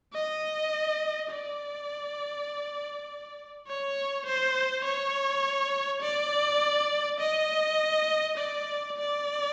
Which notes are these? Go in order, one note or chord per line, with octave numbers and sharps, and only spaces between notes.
D#5
D5
C#5
C5
C#5
D5
D#5
D5
D5